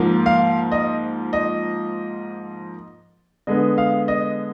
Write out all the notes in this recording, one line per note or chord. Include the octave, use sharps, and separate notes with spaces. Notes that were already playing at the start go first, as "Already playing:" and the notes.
Already playing: G#2 F3 A#3
F5
D#5
D#5
D3 G#3 B3 D#5
F5
D#5